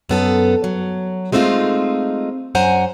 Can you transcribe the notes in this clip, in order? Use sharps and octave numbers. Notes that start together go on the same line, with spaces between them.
F#2 B3 A4
F#3
G#3 A3 C4 D#4 F4
F#2 C5 F#5 G#5 A#5